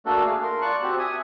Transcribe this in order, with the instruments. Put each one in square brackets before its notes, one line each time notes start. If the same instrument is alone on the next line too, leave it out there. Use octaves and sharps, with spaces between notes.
[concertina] A3 A#3 D4 F#4 A4
G#4 F5
A#4 C6
F4 D5 A5 C#6 F#6
C4 F#4 G4
E5 G#5 D#6